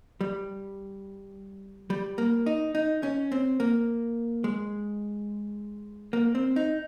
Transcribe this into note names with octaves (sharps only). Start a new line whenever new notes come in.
G3
G3
A#3
D#4
D#4
C#4
C4
A#3
G#3
A#3
C4
D#4